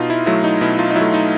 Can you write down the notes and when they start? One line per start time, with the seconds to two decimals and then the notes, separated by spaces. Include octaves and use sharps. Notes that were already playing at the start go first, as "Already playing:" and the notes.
Already playing: B2 D#4 F4
0.10 E4
0.26 F#3 A3 E4
0.44 D#4
0.61 B2 E4
0.79 D#4 F4
0.91 D#4
0.95 F#3 E4
1.01 A3
1.14 D#4